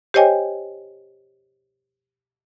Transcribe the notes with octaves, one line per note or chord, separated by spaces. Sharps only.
G4 C5 C#5 D#5 G5 G#5